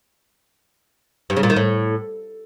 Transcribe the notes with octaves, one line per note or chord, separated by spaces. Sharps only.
G2
C#3
A#2
D#3
A2